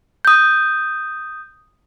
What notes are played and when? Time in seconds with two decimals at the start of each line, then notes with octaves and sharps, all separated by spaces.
0.25 D#6 G6